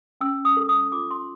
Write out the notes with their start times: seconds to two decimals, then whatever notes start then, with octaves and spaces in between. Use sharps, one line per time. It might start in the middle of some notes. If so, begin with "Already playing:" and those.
0.21 C#4 E6
0.45 D#6
0.57 A4
0.69 D#6
0.92 F4 D6
1.11 C6